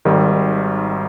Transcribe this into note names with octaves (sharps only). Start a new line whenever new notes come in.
G#1 G#2 D#3 G3